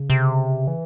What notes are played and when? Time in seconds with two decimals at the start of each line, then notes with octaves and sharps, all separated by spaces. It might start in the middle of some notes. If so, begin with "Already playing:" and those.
Already playing: C#3
0.10 C3
0.67 E3